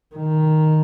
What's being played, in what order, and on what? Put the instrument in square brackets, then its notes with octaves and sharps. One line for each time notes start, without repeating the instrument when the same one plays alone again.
[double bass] D#3